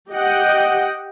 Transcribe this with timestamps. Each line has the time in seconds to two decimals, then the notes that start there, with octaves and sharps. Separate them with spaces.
0.10 G4 D#5 F#5 G5